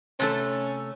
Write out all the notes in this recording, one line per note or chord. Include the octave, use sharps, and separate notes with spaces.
C3 A3 C#4 A4